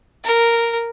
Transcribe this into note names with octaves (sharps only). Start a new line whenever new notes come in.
A#4